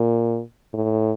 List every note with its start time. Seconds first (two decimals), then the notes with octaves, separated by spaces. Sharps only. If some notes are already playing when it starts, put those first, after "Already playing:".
Already playing: A#2
0.74 A2